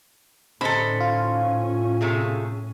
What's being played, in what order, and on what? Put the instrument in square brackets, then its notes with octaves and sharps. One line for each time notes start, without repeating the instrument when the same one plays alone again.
[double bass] A2 C#4 [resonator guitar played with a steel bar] D3 D#4 C5 [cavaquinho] A4 B5
[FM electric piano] F4
[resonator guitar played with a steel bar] C3 A3 G#4